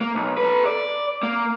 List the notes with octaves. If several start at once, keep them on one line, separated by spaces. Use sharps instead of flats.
A#3
B1
A4 B4
D5
A#3